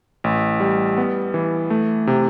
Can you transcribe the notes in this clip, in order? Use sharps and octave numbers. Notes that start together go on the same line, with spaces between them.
A1
G3
B3
E3
A3
C3